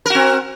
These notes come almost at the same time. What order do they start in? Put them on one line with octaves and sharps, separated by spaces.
A#4 F#4 C4